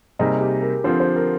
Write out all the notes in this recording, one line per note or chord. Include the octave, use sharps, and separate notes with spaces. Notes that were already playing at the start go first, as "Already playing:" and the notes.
C3 G3 A#3 D#4 G#4
G4
A#4
D3 F3 C4 F4 C5
C5
A#4